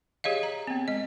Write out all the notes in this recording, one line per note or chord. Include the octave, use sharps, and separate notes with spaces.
G4 G#4 C#5 D#5 F5
A#5
B3 C4
G#3 D#5